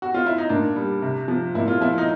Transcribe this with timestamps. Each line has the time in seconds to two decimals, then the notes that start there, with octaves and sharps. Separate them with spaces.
0.02 F#4
0.14 F4
0.26 E4
0.38 D#4
0.49 A#2 D4
0.76 G3
1.02 C3
1.28 F3
1.55 A#2 E4
1.68 F4
1.81 F3 E4
1.98 D#4